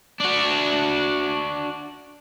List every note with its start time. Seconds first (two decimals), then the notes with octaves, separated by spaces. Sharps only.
0.20 D4 F#4